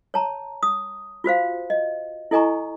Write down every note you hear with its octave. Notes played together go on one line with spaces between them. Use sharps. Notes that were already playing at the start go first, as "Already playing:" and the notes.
C#5 A5 A#5
D#6
F4 F#4 C5 F5
D#5
E4 A4 D#5 G#5 A#5 C#6